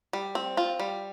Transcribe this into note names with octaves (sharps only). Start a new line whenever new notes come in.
G3
C4
F4
G3